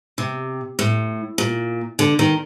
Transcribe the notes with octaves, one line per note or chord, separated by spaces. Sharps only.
C3
A2
A#2
D3
D#3